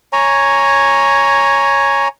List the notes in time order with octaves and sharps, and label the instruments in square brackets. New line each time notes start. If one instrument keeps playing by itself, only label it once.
[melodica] C#5 G#5 A#5